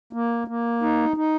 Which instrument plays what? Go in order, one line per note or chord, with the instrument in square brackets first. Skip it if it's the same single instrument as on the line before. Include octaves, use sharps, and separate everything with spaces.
[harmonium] A#3
A#3
D#4
D#4